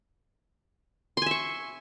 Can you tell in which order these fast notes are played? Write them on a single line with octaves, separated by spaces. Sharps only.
C6 G#5 E5 C#6